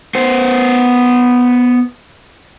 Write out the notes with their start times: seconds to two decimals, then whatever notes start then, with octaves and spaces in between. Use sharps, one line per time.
0.15 B3 C5